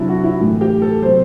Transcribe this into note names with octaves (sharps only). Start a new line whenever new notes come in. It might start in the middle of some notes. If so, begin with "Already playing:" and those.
Already playing: C3 F#3 D4 E4
F#4
E4
A2 E3
G4
A4
C3 F#3 C5